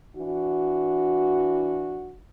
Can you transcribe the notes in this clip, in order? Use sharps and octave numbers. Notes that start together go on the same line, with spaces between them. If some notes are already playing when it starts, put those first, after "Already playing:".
E3 D4 F#4